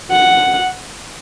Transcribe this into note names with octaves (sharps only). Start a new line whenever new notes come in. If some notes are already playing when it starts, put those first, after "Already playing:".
F#5